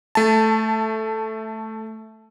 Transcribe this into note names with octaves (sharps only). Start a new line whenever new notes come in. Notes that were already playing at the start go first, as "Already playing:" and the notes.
A3 A5